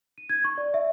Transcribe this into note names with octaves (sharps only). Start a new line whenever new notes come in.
D#7
G#6
C#6
D5
E5